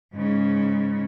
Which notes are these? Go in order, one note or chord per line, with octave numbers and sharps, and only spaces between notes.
G#2 C#3